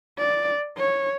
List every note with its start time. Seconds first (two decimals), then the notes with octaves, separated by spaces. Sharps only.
0.19 D5
0.77 C#5